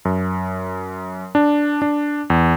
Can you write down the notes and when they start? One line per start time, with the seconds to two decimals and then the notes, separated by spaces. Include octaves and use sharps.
0.05 F#2
1.35 D4
1.82 D4
2.30 E2